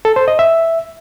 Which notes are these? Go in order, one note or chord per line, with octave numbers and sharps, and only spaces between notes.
A4
C5
D#5
E5